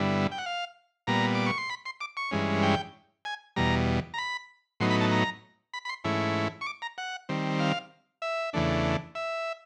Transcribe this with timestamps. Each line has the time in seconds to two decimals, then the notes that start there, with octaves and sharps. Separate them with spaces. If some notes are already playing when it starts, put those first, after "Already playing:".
Already playing: G2 D3 G3 B3 E4
0.32 G5
0.38 F#5
0.46 F5
1.07 A#2 G3 B3 A#5
1.35 D6
1.46 C#6
1.58 C6
1.70 B5
1.86 C6
2.01 D6
2.17 C#6
2.31 G2 E3 G#3 C#4
2.63 G5
3.25 G#5
3.56 E2 B2 G3 A#5
4.14 A#5
4.18 B5
4.80 A2 F#3 B3 D#4 C6
4.91 B5
5.01 A5
5.11 A#5
5.74 B5
5.85 B5
5.89 C6
6.04 G#2 E3 A3 C#4 E4
6.61 C#6
6.66 D6
6.82 A#5
6.98 F#5
7.29 D#3 G3 C4
7.60 F5
8.22 E5
8.53 E2 C#3 E3 A3 D4
9.15 E5